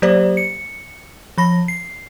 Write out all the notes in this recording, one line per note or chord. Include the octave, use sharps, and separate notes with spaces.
F#3 A#3 G4 C5 D5
C#7
F3 B5 A#6
C7